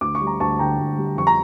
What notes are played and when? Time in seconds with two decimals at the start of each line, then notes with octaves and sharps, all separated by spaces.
0.01 D2 D6
0.15 C#6
0.21 G3
0.27 A#5
0.40 D2 A5 C#6
0.59 D3 G5 A#5
0.79 D2
0.98 G3
1.18 F2 C#6
1.27 A#5